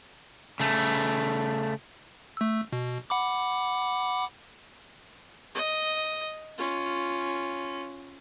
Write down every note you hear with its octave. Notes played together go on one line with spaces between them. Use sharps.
C#3 A3
A3 E6
B2
F#5 B5 D6
D#5
C#4 F4